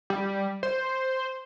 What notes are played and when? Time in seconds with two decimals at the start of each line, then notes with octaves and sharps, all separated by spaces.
0.10 G3
0.63 C5